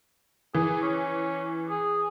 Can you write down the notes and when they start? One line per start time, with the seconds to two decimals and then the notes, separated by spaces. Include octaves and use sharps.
0.55 E3 G#4
0.82 C#4
1.70 G#4